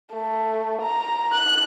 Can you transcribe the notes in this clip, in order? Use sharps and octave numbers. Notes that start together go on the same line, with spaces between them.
A3
A#5
F#6